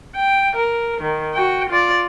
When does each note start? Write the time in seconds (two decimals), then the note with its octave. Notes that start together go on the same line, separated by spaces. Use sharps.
0.16 G5
0.56 A#4
1.01 D#3
1.34 F#4 G5
1.70 F4 D5